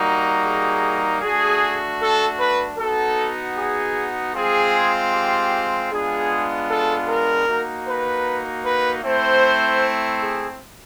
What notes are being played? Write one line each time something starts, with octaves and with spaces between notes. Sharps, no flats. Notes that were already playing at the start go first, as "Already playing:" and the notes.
Already playing: G3 A#3 D#4 F#4
G#4
A3 D4 F#4 G#4
A4
B4
B3 D#4 F#4 A4
G#4
G#3 C4 F4 G#4
G4
G#3 B3 D4 F4 G#4
A4
A#4
A#3 D#4 F#4
B4
B4
A3 C4 E4 C5
G#4